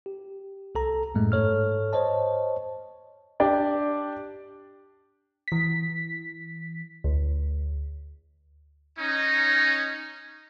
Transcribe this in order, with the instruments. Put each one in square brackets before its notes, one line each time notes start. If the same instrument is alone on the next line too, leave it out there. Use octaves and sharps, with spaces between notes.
[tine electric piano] G4
C2 A4 A#5
F#2 A2 G#3 A3
G#2 A4 C#5 F6
C5 C#5 D#5 A5
[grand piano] D4 G4 D5 G5
[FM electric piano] E3 B6
D2
[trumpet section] C#4 D#4